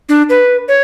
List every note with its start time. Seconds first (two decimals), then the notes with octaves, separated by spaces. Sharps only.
0.09 D4
0.29 B4
0.68 C#5